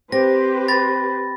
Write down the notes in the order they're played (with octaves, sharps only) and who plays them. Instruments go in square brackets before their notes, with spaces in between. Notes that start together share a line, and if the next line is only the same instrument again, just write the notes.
[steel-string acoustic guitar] C4 [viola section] G4 B4 C5 [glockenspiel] A#6
[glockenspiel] B5 A6 A#6